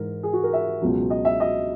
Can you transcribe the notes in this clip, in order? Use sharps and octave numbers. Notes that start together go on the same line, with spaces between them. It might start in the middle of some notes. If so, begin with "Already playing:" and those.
Already playing: G#2 E3 A#4
G#4
F#4
A#4
E5
C#2 B2 F#3
D#5
E5
D#5